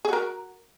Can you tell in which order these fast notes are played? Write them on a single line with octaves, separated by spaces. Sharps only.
G#4 F#4 A#4